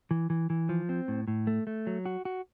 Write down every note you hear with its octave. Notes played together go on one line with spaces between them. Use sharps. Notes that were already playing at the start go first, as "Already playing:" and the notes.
E3
E3
E3
F3
C4
A2
A2
A3
A3
F#3
F#4
F#4